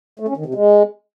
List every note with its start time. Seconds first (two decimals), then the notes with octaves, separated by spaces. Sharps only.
0.19 A3
0.28 C#4
0.37 D#3
0.46 C3
0.55 G#3